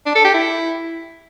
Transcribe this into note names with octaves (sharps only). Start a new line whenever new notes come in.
D4
A4
G4
E4